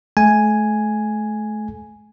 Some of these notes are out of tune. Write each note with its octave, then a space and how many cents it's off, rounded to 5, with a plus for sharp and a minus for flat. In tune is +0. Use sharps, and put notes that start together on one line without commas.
A3 -35 G#5 +0